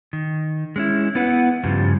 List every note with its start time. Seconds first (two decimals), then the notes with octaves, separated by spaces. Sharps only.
0.13 D#3
0.76 G#3 C#4 E4
1.15 B3 E4 B4 F#5
1.64 G2 C#3 F3 G3